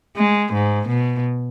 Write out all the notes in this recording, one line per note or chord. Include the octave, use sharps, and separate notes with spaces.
G#3
G#2
B2